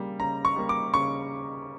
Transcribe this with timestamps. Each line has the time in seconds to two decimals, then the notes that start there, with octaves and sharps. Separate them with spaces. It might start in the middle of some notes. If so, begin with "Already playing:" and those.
Already playing: C#3 G3 A#3
0.19 C#3 A#5
0.45 C#6
0.56 G3 A#3
0.69 D6
0.94 C#3 C#6